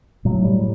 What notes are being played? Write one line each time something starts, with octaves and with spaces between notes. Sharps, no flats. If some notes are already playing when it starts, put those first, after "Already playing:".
A2 F#3
G3